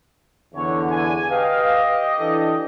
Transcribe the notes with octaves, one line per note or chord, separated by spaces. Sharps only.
E2 D3 C#5
G#5
G4 B4 D#5 F5
E3 D4 A4